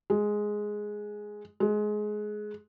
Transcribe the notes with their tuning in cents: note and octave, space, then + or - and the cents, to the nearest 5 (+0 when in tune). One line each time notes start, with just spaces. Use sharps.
G#3 +5
G#3 +20